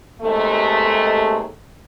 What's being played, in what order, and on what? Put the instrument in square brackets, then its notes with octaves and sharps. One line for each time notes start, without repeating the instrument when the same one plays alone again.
[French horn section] D#2 C3 G#3 A3